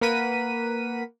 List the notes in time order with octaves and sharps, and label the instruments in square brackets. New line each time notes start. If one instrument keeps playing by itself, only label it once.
[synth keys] A#3 A#4 B4 F#5 B6 D#7